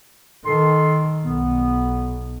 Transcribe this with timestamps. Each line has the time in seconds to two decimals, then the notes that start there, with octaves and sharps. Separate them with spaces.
0.46 D#3 A4 C6
1.25 B1 B3